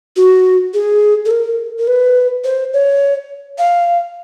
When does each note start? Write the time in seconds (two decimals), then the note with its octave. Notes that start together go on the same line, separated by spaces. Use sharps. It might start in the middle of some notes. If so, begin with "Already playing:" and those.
0.16 F#4
0.74 G#4
1.26 A4
1.31 A#4
1.78 A#4
1.87 B4
2.44 C5
2.74 C#5
3.58 F5